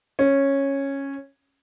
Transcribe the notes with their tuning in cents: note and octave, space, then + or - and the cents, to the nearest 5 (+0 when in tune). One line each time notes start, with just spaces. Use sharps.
C#4 -10